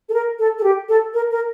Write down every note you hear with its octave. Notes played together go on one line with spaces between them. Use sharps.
A4
A#4
A4
A4
G4
A4
A#4
A#4